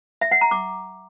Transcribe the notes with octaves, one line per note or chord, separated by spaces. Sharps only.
E5
F#5
A#5
D6